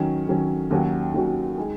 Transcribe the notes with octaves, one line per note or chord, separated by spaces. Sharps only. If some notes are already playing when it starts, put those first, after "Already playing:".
Already playing: D#3 F#3 C#4
D#3 F#3 C#4
D#2 D#3 F#3 C#4 F#4
D#2 D#3 F#3 C#4 F#4
G#3 D#4 G#4